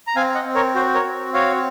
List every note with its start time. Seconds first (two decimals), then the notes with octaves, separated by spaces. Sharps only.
0.07 A#5
0.16 C4 F5 G#5
0.35 D#5 F#5
0.45 C4
0.55 A#4 C#5
0.75 F#4 C5
0.95 A#4 C#5
1.04 C4
1.33 F#4 C#5 F5